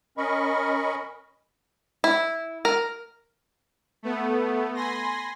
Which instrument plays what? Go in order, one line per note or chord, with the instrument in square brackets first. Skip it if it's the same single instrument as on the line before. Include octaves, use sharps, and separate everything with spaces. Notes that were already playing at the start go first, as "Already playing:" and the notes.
[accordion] C#4 A#4 D#5 B5 C#6
[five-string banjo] E4
A#4
[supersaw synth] A3 B3
G#5 B5 C6 A#6